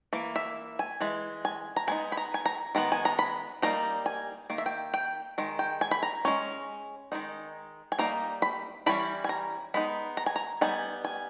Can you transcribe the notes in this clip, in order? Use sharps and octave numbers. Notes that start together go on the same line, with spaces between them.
E3 A#3
E5
G#5
E3 G#3
G#5
A#5
G#3 B3 D#4 G#5
B5
A#5
G#5
A#5
D#3 G#3 B3 A#5
G#5
A#5
B5
G3 A#3 D#4 A#5
G#5
D#3 A#3
E5
G5
G5
D#3 G#3
G5
G#5
B5
A#5
G#3 C#4
D#3 G#3 D#4
G#5
G3 A#3 D#4 A#5
B5
E3 G3 C#4 B5
G#5
A#5
G#3 B3 D#4 B5
A#5
G#5
A#5
G3 B3 D#4 G#5
G#5